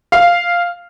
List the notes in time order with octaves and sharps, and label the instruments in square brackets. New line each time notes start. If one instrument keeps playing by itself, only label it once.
[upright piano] F5